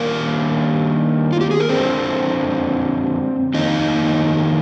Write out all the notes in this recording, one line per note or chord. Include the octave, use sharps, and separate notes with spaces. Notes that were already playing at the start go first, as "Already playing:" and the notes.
Already playing: D#3 G3 A#3 D4 A#4
F4
G4
G#4
A#4
F2 D3 G#3 C4 D4 C5
F2 D#3 A#3 D#4 D#5